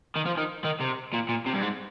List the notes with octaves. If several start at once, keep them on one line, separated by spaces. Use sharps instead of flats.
D#3
F3
D#3
D#3
C3
A#2
A#2
C3
G2
G#2